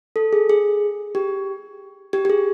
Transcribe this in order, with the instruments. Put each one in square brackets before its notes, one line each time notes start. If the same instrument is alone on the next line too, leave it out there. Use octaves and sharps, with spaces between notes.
[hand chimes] A4
G#4
G#4
G4
G4
G4
G#4